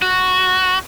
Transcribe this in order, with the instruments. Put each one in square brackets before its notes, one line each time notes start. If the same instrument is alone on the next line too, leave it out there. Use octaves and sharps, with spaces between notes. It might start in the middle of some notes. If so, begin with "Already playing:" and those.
[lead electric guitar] F#4